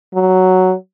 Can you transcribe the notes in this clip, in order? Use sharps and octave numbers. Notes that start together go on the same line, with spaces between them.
F#3